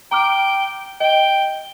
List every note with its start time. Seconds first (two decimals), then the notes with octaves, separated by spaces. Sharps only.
0.11 G5 A#5 D6 F6
1.00 D#5 G5